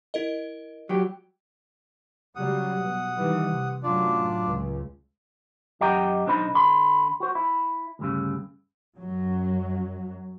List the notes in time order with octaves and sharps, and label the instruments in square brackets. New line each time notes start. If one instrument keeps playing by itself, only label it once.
[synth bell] E4 A#4 D#5
[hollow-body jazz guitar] F#3 G4
[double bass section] C#3 F#3 G3 [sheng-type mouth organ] F#5 D#6
[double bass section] B2
D#3 E3 G3
C3
[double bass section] F#2 A2 F#3 [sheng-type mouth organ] D4 F4 D5
[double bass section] C#2
[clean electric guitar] F#2 G4 D#5 F#5 G5 A#5
B1 D4 D#4 C5 D#5 B5
D3 B5 C6
F#4 C5
E4
D2 G2 C#3
[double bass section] F#2 F#3